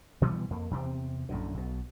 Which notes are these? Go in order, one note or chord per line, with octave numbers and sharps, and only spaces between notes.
B2 E3 G3 B3
F2 A#3
E2 C3 C4
A#1 F#2 A2 D3
B1 B2